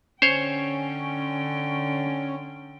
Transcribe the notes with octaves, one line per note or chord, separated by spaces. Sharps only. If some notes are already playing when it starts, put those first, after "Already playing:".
D3 C#4 C5 C#5 G5